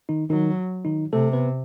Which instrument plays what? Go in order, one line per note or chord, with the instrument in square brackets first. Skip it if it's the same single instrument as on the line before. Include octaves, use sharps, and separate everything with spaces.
[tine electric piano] D#3 D#4
[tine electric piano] D#3 D#4 [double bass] F#3
[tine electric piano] D#3 D#4
[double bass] C3 [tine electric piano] A3 A4
[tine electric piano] B3 B4